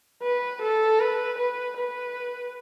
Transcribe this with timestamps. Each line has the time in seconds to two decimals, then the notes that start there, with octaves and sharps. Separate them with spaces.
0.23 B4
0.62 A4
1.00 B4
1.38 B4
1.77 B4